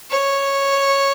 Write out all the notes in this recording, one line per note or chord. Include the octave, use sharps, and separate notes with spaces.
C#5